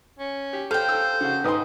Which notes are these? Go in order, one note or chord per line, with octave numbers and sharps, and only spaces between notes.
C#4
G4
A4 C5 F5 G5
E6
C#3 F#4
G#2 B4 D#5 G5 C6 D#6